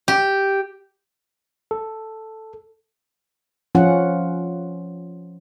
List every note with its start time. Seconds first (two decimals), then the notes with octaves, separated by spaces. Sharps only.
0.08 G4
1.71 A4
3.75 F3 C#4 F4 F#5